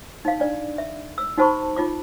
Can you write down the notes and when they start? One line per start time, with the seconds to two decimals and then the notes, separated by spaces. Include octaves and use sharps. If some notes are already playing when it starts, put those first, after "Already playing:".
0.25 D#4 F5
0.40 D4 D5
0.78 E5
1.18 E6
1.38 D#4 F#4 C5 A5 B5 C#6
1.76 D#4 F4 D6